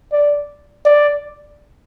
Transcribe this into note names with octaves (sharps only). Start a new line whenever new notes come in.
D5
D5